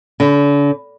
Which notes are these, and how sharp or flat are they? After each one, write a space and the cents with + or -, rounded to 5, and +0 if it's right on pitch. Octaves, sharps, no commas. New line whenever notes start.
D3 -40